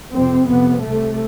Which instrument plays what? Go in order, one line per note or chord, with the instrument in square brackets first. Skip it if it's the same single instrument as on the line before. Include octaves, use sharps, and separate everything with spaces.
[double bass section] F2 C3 C4
F2 C3 B3
C2 C3 A3